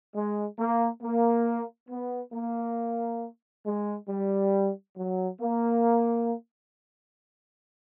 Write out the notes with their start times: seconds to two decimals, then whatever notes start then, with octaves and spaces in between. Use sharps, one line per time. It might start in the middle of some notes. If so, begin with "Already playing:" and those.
0.14 G#3
0.57 A#3
1.01 A#3
1.89 B3
2.32 A#3
3.64 G#3
4.08 G3
4.96 F#3
5.40 A#3